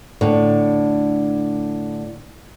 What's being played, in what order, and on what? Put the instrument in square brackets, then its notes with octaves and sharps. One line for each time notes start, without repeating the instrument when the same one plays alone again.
[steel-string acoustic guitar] A2 D3